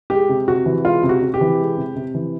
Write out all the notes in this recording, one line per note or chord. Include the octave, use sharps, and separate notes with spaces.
G#3 G4
C3
C3 F#4
E3
G#3 F4
C3
F#4
C3
G4
E3
G#3
C3
C3
E3